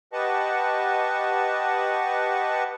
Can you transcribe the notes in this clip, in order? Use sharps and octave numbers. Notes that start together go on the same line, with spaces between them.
G4 B4 D#5 F#5 A5 C#6